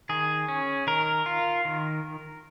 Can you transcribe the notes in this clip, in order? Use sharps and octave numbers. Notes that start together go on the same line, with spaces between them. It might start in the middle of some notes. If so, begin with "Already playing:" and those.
D#3 G#4
C#4
D#3 A#4
F4
D#3